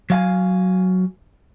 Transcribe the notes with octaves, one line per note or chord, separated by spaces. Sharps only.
F#3 F5 G#5